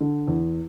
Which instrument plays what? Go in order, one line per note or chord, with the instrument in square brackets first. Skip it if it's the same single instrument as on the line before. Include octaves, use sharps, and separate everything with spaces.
[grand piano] D3
E2